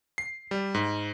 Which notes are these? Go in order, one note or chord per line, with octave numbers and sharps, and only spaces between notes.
C7
G3
G#2